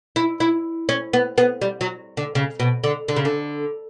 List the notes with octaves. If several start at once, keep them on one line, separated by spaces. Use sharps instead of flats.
E4
E4
C#4
B3
B3
G3
F#3
D3
C#3
B2
D3
D3
C#3
D3